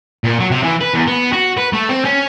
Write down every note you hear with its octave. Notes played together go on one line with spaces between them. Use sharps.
A#2
F#3
C3
E3
B4
E2
B3
F#4
B4
A3
C4
C#4